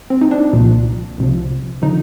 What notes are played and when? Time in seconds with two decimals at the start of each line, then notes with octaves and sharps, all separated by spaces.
0.10 C4
0.21 D#4
0.31 D4
0.53 C2 A#2 F3
1.18 C2 C3 F3
1.82 D3 F3 D#4